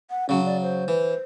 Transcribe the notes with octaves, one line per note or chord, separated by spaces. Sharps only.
F#5
C#3 F#3 C#4
D5
C5
E3